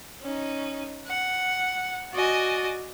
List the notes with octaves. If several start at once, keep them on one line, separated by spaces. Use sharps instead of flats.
C#4 D#4
F#5
F#4 D5 D#5 G#5